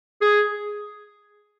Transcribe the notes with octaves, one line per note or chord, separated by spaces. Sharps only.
G#4